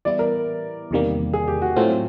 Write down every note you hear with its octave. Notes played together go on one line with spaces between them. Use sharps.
E3 G3 B3 E4 D5
A#4
E2 C3 D#3 G3 A#3
G#4
G4
F#4
A2 F#3 A3 C4 F4